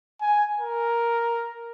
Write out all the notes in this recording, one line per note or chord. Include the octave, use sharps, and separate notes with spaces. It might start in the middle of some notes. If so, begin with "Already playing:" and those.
G#5
A#4